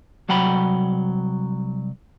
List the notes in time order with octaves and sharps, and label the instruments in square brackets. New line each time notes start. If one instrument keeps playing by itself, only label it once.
[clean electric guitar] C2 F#3 F#5 G5 B5